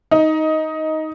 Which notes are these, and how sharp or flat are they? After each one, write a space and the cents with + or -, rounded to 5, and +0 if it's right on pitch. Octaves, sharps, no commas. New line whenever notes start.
D#4 +10